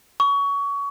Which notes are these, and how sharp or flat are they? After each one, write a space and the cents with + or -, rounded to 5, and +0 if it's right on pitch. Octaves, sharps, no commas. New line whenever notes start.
C#6 +25